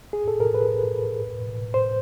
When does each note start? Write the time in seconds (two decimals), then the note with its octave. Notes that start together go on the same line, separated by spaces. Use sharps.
0.13 G#4
0.28 A4
0.40 A#4
0.54 B4
1.74 C5